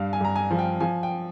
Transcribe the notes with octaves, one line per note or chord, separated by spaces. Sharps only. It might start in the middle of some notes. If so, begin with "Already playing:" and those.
Already playing: G2 F5
G#5
G2 A#5
G#5
F3
G5
F3 G#5
G5